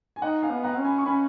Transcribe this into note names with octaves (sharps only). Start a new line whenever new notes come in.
G#5
D#4 D#5 F#5
F5 G#5
B3
F#5 A#5
C#4
G#5 B5
C#6
C#4 G#5 B5